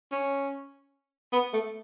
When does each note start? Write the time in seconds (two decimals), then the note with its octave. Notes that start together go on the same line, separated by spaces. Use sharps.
0.12 C#4
1.33 B3
1.53 A3